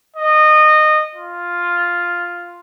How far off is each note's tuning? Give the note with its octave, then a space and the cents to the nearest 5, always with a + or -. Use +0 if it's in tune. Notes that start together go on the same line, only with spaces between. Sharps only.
D#5 -20
F4 +0